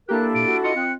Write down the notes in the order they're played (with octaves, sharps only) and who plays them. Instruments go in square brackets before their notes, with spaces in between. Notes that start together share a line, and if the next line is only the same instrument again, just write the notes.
[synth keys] A#3 G4 [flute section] D4 E4 A4 [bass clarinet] A#4 [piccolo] F#6
[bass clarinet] A#2 [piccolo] D7
[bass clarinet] F#4
[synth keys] F4 D#5 [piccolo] C#7
[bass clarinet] C4 [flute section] F#6